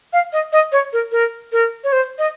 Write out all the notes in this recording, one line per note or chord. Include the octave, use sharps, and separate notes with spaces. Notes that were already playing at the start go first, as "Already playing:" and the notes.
F5
D#5
D#5
C#5
A#4
A#4
A#4
C#5
C5
D#5